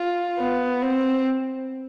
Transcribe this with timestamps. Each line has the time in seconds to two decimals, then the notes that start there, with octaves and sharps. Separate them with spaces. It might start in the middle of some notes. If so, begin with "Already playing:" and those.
Already playing: F4
0.38 B3
0.82 C4